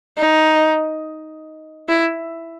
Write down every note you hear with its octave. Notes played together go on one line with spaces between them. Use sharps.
D#4
E4